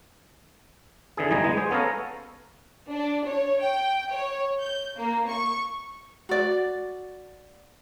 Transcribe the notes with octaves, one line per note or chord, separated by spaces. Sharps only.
D3 E3 G#4
G1 E3 G3 D#4 G#5 A#5
G#3 B3
G#4 C5
B3 C#4 A4 C#5 F5 A#5
D4
C#5
G5
C#5
G6
A#3
C#6
F#4 D5